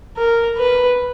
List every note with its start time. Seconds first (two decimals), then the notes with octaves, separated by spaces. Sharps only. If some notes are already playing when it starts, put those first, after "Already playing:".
0.17 A#4
0.58 B4